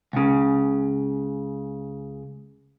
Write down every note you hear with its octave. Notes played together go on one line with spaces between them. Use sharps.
C#2 C#3